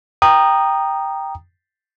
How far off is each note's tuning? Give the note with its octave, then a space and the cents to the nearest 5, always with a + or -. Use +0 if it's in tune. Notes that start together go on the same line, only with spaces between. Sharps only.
G5 +0 A#5 +0 D#6 -15